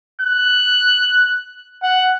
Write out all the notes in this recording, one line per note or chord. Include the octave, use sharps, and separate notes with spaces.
F#6
F#5